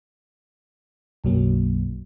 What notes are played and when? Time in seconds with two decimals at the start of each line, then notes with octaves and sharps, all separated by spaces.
1.24 B1 F#2 F#3 A#3